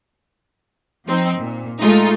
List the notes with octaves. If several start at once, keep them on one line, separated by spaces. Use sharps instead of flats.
F3 C4 D#4
A#2
G#3 A3 D#4 F4